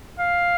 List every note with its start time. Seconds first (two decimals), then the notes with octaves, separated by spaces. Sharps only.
0.19 F5